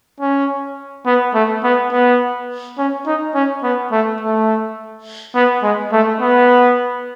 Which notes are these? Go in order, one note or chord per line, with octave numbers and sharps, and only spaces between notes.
C#4
B3
A3
B3
B3
C#4
D#4
C#4
B3
A3
A3
B3
G#3
A3
B3